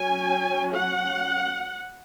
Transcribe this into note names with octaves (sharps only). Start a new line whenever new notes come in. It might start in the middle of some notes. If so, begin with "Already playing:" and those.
Already playing: F#3 C#4 G#5
F#5